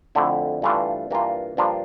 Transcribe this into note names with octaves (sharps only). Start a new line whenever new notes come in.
F2 D3 A3 E4
G2 E3 A3 D4 F4
G2 E3 A#3 D4 F4
G2 F3 A#3 D4 F4